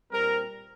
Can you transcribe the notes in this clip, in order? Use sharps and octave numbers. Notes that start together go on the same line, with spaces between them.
A#2 G3 C4 A#4